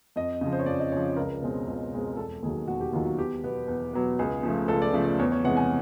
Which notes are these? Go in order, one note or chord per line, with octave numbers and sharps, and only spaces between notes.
F2 D#5
C#3 F3
C5
C#5
F2 D5
D#5
C#3 F3 C#5
C#2 A#4
B2 G#3 C4
C#2
B2 G#3 C4
E1 A4
D#2 D#3 F#3 G#4
E1 F#4
G4
D#2 D#3 F#3 F4
F#4
E2 G4
B2 F#3 B3
E2
B2 F#3 B3
C#2 G#4
C#3 F3 A3
C#2 A4
D5
C#3 F3 A3
D5
E2 C#5
C#5
C3 E3 G#3 F#5
G#5